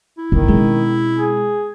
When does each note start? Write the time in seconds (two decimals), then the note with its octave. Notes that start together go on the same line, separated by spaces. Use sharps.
0.18 E4
0.32 G1 D#3
0.48 B2 G#3 C4 C#4
1.15 G#4